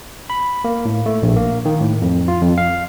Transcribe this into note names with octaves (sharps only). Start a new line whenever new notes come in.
B5
A#3
A2
A3
A#1
A#3
D#3
A2
F2
F4
F2
F5